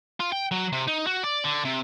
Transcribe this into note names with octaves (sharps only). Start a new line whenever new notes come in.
F4
G5
F#3
C3
D#4
F#4
D5
D3
C3